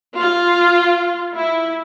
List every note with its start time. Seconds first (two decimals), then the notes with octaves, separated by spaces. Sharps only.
0.17 F4
1.35 E4